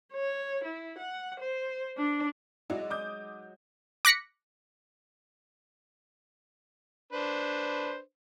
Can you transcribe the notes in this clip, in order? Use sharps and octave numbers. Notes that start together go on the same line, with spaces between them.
C#5
E4
F#5
C5
D4
F#3 G#3 D#4 E4 F#4 D5
D6 D#6 G6
D6 F#6 A#6 B6 C#7
D4 B4 C5